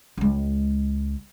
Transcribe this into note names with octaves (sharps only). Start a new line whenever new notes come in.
C#2 G#3